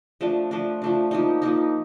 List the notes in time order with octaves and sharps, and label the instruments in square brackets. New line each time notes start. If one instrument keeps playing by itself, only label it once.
[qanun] F3 A3 D4
F3 A3 D4
F3 A3 D4
F3 A#3 D#4
F3 A#3 D#4